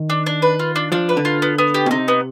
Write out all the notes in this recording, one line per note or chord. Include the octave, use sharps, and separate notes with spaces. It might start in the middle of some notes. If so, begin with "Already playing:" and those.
Already playing: D#3
D4
D4
B4
F4
D4
F3 D4
B4
D3
F4
B3
B3
G4
B2
C3 D#4
B3